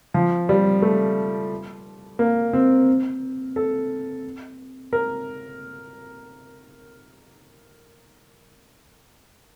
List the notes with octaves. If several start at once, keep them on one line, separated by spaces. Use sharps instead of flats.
F3
G3
A3
A#3
C4
A4
A#4